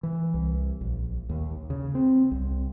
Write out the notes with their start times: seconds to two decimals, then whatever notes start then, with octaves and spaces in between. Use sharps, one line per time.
0.03 E3
0.34 C2
0.81 A#1
1.29 D#2
1.70 C#3
1.95 C4
2.31 C2